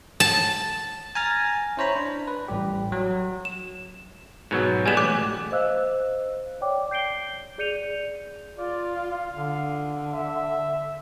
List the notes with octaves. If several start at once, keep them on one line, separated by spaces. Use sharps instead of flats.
A5
G#5 A#5 F6 A6 A#6
C#4 E4 C5 C#5 A#5 B5
D4
B4
A1 G3 G4
F#3
E7
G#2 B2 F#3
G3 G#3 B3 G#5 E7
A1 D6 F#6
C5 D#5 F5 E6 F#6
C#5 D5 G5 D6
G6 C7 D7 G7
G#4 D5 G6 C#7 D#7 F7
F4 D5
F5
D3
E5